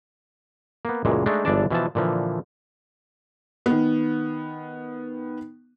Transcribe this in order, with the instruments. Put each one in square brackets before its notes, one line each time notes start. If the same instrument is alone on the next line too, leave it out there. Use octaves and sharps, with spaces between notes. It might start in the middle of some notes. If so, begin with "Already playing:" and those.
[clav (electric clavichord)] A#3 B3
C#2 F#2 A#2 E3 G#3 A3
G#3 A3 D4 D#4
G1 E3 G#3 D4 D5 A5
B2 E3 F3 A5
A#2 D3 E3 F3
[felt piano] D#3 B3